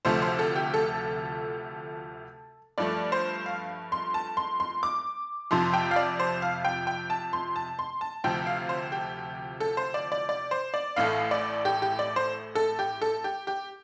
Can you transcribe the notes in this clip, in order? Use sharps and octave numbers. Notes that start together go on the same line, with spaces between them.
D2 C3 F3 A3 C5
C5
A4
G4
A4
G2 F3 A3 D5
C5
F5
C6
A5
C6
C6
D6
F2 C3 F3 C6
G5
F5
D5
C5
F5
G5
G5
A5
C6
A5
C6
A5
D2 C3 F3 C4 G5
F5
C5
G4
A4
C5
D5
D5
D5
C5
D5
A1 A2 A3 F5
D5
G4
G4
D5
C5
A4
G4
A4
G4
G4